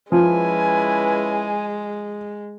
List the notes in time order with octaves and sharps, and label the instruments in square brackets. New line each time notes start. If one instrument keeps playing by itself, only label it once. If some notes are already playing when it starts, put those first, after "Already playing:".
[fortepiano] F3 [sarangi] G#3 [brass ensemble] C#4 E4 B4 [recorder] G#5